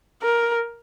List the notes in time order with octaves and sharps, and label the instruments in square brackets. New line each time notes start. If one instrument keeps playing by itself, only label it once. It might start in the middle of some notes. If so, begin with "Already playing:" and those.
[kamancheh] A#4